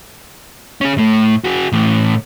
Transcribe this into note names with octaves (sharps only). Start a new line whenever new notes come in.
C#4 G#4
A2 A3
F#4 G#4
A2 E3